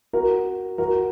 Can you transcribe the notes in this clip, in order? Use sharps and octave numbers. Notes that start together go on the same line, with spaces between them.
F#4 A#4
F#4 A#4